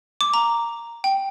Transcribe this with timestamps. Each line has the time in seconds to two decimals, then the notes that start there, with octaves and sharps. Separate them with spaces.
0.21 D6
0.34 A#5
1.04 G5